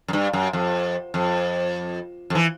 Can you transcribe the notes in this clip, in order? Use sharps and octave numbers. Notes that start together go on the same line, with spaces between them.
F#2
G2
F#2
F2
F2
F2
E3